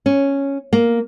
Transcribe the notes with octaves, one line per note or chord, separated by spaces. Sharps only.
C#4
A#3